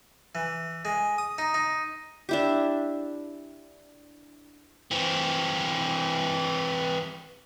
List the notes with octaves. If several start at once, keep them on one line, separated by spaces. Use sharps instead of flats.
E3
G#3
D#6
D#4
D#4
D4 E4 G4
E3 C4